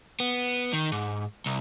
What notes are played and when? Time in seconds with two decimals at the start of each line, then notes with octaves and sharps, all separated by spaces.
0.20 B3
0.73 D#3
0.92 G#2
1.46 C2